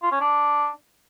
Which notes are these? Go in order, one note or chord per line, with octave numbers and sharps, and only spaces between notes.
F4
C#4
D4